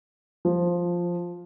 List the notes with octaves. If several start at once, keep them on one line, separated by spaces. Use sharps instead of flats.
F3